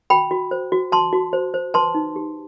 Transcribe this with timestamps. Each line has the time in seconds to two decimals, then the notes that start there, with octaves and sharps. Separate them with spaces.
0.10 F#4 G5 B5
0.31 F#4
0.51 C5
0.72 F#4
0.92 F#4 A5 C6
1.13 F#4
1.33 C5
1.54 C5
1.74 B4 A5 C6
1.95 D#4
2.16 G4